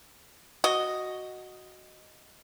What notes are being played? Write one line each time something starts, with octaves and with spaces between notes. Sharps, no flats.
F#4 D#5